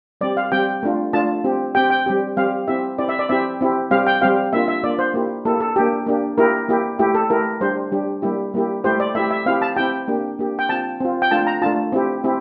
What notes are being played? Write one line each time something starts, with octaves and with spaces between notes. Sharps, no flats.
G3 C4 G4 D5
F5
G3 C4 G4 G5
A3 D4 F4
A3 D4 F4 A5
C4 G4
C4 G4 G5
G5
G3 C4 G4
G3 C4 G4 F5
C4 E4 G4 E5
C4 E4 G4 D5
E5
D5
C4 E4 G4 E5
C4 E4 G4
G3 C4 G4 F5
G5
G3 C4 G4 F5
A#3 D4 F4 E5
E5
A#3 D4 F4 D5
C5
A#3 E4 G4
A#3 E4 G4 A4
A4
A#3 D4 G4
A#3 D4 G4
A#3 E4 G4 A#4
A#3 E4 G4
A3 E4 G4
A4
A3 E4 G4 A#4
G3 D4 G4 C5
G3 D4 G4
G3 A#3 E4 G4
G3 A#3 E4 G4
A3 E4 G4 C5
D5
A3 E4 G4 E5
E5
C4 E4 G4 F5
A5
C4 E4 G4 G5
A#3 D4 G4
A#3 D4 G4
G5
C4 F4 A5
C4 F4
G5
A3 D4 F4 A5
A#5
A3 D4 F4 A5
C4 E4 G4
C4 E4 G4